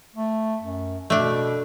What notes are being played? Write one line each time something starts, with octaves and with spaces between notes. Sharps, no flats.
A3
F#2
B2 A3 D4